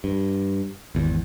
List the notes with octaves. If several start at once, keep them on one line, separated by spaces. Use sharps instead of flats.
G2
G#1 E2